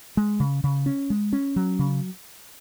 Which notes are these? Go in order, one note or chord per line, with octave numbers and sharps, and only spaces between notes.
G#3
C#3
C#3
C#4
G#3
C#4
F#3
C#3